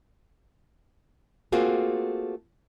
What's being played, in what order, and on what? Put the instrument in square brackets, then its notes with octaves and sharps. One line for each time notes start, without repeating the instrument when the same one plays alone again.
[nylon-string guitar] A3 A#3 C4 F4 F#4 G#4